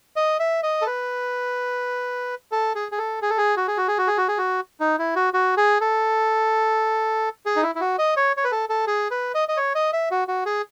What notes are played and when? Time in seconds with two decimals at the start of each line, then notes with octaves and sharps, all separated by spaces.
0.16 D#5
0.39 E5
0.63 D#5
0.82 A4
0.87 B4
2.52 A4
2.75 G#4
2.92 G#4
2.98 A4
3.22 G#4
3.30 A4
3.38 G#4
3.57 F#4
3.68 G#4
3.77 F#4
3.88 G#4
3.98 F#4
4.07 G#4
4.17 F#4
4.28 G#4
4.38 F#4
4.80 D#4
4.99 E4
5.16 F#4
5.34 F#4
5.57 G#4
5.81 A4
7.46 G#4
7.56 D#4
7.63 E4
7.75 E4
7.80 F#4
7.98 D#5
8.16 C#5
8.37 C#5
8.44 B4
8.52 A4
8.69 A4
8.87 G#4
9.11 B4
9.35 D#5
9.48 D#5
9.57 C#5
9.75 D#5
9.93 E5
10.11 F#4
10.28 F#4
10.46 G#4